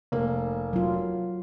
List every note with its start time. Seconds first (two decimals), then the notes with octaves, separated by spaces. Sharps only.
0.12 F1 A#3
0.73 F#3 F4